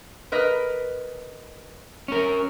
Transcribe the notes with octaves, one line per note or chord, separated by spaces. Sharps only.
A#4 B4 D#5
C#4 A#4